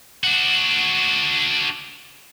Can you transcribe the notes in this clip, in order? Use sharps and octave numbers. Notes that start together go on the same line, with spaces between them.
D4 F#4